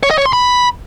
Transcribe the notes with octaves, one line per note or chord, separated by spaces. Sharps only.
C#5
D#5
C#5
C6
B5